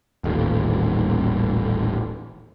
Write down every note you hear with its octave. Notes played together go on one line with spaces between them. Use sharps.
D#1 A1 D#2